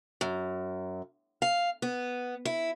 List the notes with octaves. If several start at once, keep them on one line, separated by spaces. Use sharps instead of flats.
F#2
F5
B3
E4